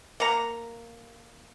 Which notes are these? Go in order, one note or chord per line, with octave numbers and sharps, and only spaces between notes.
A#3 F#5 A#5